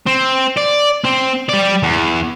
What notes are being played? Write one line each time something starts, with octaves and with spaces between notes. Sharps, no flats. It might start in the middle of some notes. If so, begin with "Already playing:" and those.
C4
D5
C4
G3 D5
E2